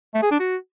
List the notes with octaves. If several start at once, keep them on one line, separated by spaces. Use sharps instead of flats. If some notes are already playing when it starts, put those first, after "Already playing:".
A3
G#4
D4
F#4